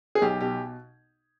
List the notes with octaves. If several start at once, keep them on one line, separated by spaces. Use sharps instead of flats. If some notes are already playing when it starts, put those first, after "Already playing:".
G#4
B1 G4
B2 G4